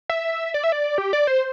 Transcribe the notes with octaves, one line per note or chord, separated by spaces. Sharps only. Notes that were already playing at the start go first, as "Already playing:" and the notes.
E5
D5
E5
D5
G4
D5
C5